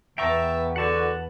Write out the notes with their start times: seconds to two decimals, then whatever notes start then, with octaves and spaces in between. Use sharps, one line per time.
0.18 E2 B3 E5 G5 A5 A#5 C#6
0.76 D3 F#4 F#5 A5